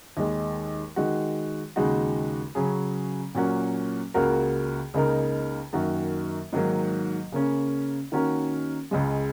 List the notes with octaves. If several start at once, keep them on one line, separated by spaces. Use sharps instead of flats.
D#2 D#3 G#3
D#3 G#3 F#4
D#2 C#3 G#3 D#4 F#4
C#3 F#3 C#4 G#4
A#2 F#3 C#4 F#4 A#4
C#2 C#3 A#3 F#4 A#4
C#2 C#3 A#3 D#4 A#4
F#2 D#3 A#3 F#4 A#4
G#2 D#3 F#3 A#3
C#3 A#3 C#4
D#3 A#3 C#4 F#4 A#4
C#2 C#3 G#3